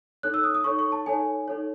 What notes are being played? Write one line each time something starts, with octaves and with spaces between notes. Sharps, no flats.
D#4 A4 C#5 F#6
E6
D#6
D#6
D#4 A4 C#5 C#6
C#6
A5
D#4 A4 C#5 G#5
D#4 A4 C#5